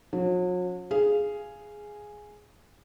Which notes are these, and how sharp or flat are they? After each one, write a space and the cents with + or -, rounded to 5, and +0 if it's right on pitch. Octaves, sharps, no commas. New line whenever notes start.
F#3 -40 C#4 +0
G#4 +0 F5 -15